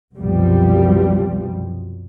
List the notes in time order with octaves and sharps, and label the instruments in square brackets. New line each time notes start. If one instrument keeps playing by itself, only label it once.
[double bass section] C2 F#2 B2 F3 G3